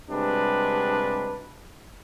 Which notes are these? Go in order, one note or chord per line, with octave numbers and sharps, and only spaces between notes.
C3 G3 G#3 D4 F#4 B4